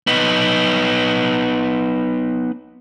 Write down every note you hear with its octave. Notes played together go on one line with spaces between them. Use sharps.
B3 D#4